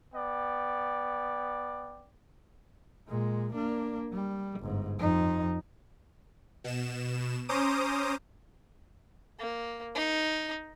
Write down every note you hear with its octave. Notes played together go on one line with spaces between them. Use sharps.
B3 D5 G5
A#2 G#3
A#3 D4
G3
G1 G#2
F2 D#4
B2 E7
C#4 C5 A#5 D6 D#6 D#7
A#3
D#4